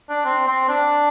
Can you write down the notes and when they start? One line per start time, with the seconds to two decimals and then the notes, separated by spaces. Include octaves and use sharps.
0.10 D4
0.25 C4
0.48 C4
0.69 D4